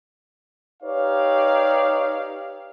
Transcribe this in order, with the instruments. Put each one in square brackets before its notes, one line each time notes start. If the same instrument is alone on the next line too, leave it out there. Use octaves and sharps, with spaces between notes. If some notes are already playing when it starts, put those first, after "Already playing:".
[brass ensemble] D#4 G4 B4 C#5 D5 F5